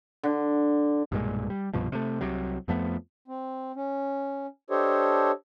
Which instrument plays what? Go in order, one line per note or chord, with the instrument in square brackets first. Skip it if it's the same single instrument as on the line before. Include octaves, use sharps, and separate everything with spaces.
[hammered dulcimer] D3
[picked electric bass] B1 G2 A#2 G#3
G3
C2 G2 B2 F3
C3 A3
C2 C3 F#3
F2 F3 A3 B3
[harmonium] C4
C#4
D4 G4 A4 C5 C#5 D#5